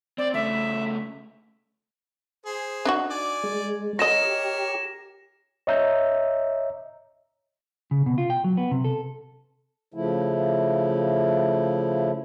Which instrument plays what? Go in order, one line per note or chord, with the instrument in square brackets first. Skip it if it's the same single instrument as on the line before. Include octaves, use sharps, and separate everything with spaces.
[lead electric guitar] C4 [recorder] D5
[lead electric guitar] C#3 A3 [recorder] E5
[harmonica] G#4 C5
[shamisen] D4 D#4 F#4
[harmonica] D5 G#5
[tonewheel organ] G#3
[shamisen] F#4 D#5 [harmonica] A#4 C#5 [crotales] A#6 E7
[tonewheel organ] G4
[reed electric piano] C#5 D#5 E5 A#5 E6 G6
[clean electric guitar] C#3
B2
F4
G5
F#3
B3
C3
A4
[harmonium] C#3 F3 A3 E4